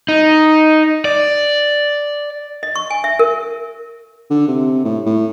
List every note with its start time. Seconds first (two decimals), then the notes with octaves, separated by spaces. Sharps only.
0.09 D#4
1.05 D5
2.63 D#5
2.76 C#6
2.90 G#5
3.04 E5
3.19 A#4
4.30 D3
4.48 C3
4.85 A2
5.06 A2